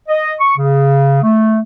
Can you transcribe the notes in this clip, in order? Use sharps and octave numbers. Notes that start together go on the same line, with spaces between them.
D#5
C#6
C#3
A3